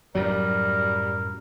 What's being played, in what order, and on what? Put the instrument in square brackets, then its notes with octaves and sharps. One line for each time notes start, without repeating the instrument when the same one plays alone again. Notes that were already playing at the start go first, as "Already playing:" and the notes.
[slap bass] F#2 A2 F#3 [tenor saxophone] G3 [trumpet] A#4